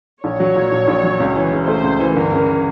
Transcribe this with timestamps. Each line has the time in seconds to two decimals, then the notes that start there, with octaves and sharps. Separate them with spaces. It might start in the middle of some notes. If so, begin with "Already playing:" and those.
0.23 A#1 C#5
0.40 F#3
0.56 A#2
0.72 A#1
0.88 A#1
1.04 F#3
1.20 C#2
1.36 E3
1.52 C#3
1.68 A3 C5
1.84 C#2
2.00 E3
2.16 G1 A#4
2.32 C#3